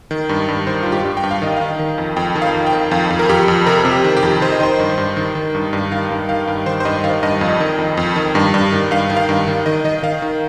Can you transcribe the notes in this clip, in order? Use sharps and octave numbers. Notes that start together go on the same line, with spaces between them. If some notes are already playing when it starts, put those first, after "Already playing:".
D#3
G2
G2
D#3 C5
G2 F4
G4
G2
G5
G2
F5
D#3 D#5
D#3 F5
D#3
F2
F2 G5
D#3
F5
F2
G5
D#3
F2 F5
F2
A#4
F2 G4
F2
C3 A#4
C3
G4
D#3
G4
F2
D#3 C5
D#5
D#3 C5
G2
G2
D#3
D#3
G2
G2
D#3 F5
G2
D#3 F5
G2
D#3 C5
C5
G2 D#5
D#3 F5
G2 D#5
F2
D#3
F2
F2
D#3
G2
G2
D#3
G2 F5
D#3
F5
G2
D#3
D#3 D#5
D#3 D#5
D#3 F5
D#3